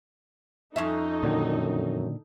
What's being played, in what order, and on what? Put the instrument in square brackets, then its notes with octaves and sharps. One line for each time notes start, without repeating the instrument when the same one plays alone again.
[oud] F2 C#4 E5 [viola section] D#4 A4
[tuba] F#2 [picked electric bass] A#2 D3 D#3